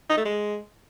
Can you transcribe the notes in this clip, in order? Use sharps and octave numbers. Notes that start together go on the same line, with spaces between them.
D#4
A3
G#3